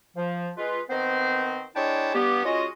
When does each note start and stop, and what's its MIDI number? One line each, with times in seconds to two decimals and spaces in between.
0.16 0.50 53
0.57 0.81 56
0.57 0.81 65
0.57 0.81 71
0.90 1.64 51
0.90 1.64 59
0.90 1.64 60
0.90 1.64 70
0.90 1.64 72
1.76 2.13 56
1.76 2.13 62
1.76 2.13 64
1.76 2.13 73
1.76 2.13 79
1.76 2.13 81
2.15 2.42 43
2.15 2.42 59
2.15 2.42 67
2.45 2.67 56
2.45 2.67 61
2.45 2.67 65
2.45 2.67 66
2.45 2.67 75